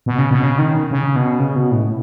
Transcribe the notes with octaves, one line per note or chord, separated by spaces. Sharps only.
B2
C#3
B2
C#3
D#3
C#3
B2
C#3
B2
A2